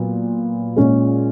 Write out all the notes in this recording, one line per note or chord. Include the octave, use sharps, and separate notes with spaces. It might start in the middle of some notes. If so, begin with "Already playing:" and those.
Already playing: A#2 F#3 B3 F4
A#2 G#3 C#4 F4 G#4